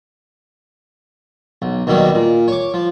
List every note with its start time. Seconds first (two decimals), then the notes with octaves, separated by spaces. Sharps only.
1.62 B1
1.87 D#2 B2 D#3 F#3 G3
2.15 A#2
2.48 C#5 D6
2.74 F3